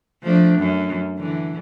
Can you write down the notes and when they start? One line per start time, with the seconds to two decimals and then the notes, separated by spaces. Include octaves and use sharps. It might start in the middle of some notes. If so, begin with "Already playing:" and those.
0.23 F3 A3 D4
0.58 F#2
1.18 D3 E3